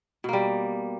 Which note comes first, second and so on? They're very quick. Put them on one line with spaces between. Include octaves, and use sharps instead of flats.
B2 A#3 G3